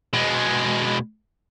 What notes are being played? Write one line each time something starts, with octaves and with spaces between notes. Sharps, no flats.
B2 G#3